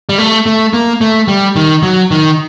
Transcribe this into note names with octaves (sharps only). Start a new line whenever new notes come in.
G3
A3
A3
A#3
A3
G3
D#3
F#3
D#3